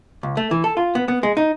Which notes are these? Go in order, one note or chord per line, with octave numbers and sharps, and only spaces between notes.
C#2
A3
E3
A4
F4
B3
B3
G#3
D#4